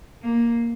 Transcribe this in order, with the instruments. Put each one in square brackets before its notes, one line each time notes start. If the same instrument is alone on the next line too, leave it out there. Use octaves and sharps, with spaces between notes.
[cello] A#3